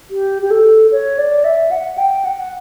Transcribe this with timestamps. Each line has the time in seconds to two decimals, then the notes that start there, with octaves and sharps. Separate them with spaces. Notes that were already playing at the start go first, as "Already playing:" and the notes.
0.11 G4
0.42 G4
0.51 A4
0.92 C#5
1.18 D5
1.44 E5
1.71 F#5
1.98 G5
2.25 F#5